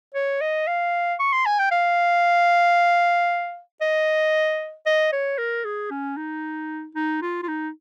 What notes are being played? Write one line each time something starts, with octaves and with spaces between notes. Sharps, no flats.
C#5
D#5
F5
C#6
C6
G#5
G5
F5
D#5
D#5
C#5
A#4
G#4
C#4
D#4
D#4
F4
F4
D#4